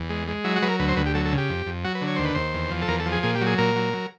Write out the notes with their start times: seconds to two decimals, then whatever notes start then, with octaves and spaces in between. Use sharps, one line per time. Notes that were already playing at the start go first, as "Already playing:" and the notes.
Already playing: E2
0.10 G#3
0.28 G#3
0.44 F#3 E4
0.56 F#4
0.62 F#3 B4
0.68 A#4
0.79 D2 B4
0.89 C5
0.96 D2 B4
1.06 G4
1.14 F#3 A4
1.25 A4
1.32 C#3
1.38 G4
1.50 F2
1.66 F2
1.84 F#3 F#4
1.95 B4
2.01 D3
2.07 C#5
2.16 D#2 C5
2.25 B4
2.35 D#2 C5
2.54 E2
2.71 F3
2.82 A4
2.88 E2 A#4
3.00 A4
3.06 F3
3.12 G#4
3.23 A#2 G#4
3.35 G4
3.41 F#3
3.46 G#4
3.58 A#2 A#4
3.75 F#3
3.93 F#3